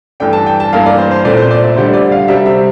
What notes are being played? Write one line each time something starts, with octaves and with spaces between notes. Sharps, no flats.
G2 E3 A3 D4 G5
A5
G5
A5
G2 E3 A#3 F5
D5
C5
C5
A#2 A3 C4 D5
C5
D5
E5
D3 G3 D4 C5
D5
F5
C3 G3 C4 E5
E5